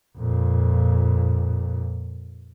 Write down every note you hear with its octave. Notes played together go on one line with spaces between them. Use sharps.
F2 A#2